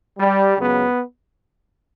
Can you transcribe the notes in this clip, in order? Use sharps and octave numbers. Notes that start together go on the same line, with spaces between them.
G3
C#2 C#3 F#3 B3